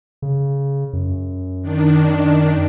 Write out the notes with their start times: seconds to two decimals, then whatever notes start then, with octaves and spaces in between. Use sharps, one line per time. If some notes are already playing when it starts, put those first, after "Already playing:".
0.22 C#3
0.93 F#2
1.62 D#3 D4